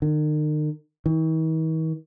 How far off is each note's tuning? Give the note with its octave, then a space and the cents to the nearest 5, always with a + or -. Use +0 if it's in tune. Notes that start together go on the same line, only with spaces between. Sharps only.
D#3 -40
D#3 +45